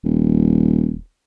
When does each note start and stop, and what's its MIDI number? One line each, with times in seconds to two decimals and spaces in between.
0.04 0.97 27